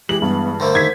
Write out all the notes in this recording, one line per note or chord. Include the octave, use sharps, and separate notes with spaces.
E3 G#3 G4 F#7
G2 B3
D3 A3 A#3 C5
D#3 G#6 B6